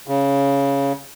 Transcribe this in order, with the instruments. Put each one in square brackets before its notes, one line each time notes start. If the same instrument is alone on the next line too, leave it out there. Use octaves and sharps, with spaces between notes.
[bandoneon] C#3